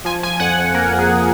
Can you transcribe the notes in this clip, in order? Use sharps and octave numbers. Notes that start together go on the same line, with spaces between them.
F3 G#5
F3 G#5
F2 F#5
F2
A#3 A#4
F2
G#4